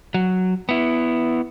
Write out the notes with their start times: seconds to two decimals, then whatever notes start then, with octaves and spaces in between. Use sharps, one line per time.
0.14 F#3
0.69 B3 E4